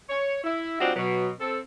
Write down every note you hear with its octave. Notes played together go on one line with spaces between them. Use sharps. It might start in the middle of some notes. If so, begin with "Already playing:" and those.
C#5
E4
G3 C4 D4 D#4 F4 F#4
B2 F#3
C4 A4